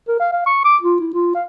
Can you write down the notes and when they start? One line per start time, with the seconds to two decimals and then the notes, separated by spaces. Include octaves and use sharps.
0.08 A#4
0.20 F5
0.33 F5
0.46 C#6
0.65 D6
0.83 F4
1.00 E4
1.14 F4
1.35 F5